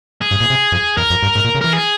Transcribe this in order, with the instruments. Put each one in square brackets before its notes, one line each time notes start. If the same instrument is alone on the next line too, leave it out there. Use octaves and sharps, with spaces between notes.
[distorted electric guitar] G#4
[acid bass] G2
A#2
C3
F2
[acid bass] E2 [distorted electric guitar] A#4
[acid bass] F2
G2
G#2
A#2
C#3
[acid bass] E3 [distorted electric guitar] A#4
[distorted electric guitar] G#4